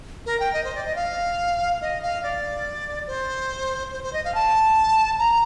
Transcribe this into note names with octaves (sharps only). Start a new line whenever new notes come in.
A#4
G5
D#5
C5
D5
D#5
F5
D#5
F5
D5
C5
C5
C5
D#5
F5
A5
A#5